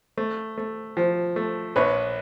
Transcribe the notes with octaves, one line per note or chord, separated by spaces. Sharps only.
A3
A3
F3
A3
A#1 B4 C#5